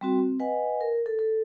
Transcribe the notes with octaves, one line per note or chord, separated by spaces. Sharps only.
G3 C4 F#4
C4
B4 D#5 F#5 G#5
A#4
A4
A4